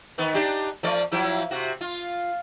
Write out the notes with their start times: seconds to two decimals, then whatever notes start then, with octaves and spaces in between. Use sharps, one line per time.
0.18 D#3 B3
0.34 D4 D#4 G4
0.83 F3 A3 D5
1.12 F3 F#3 E4
1.51 C3 F#4
1.81 F4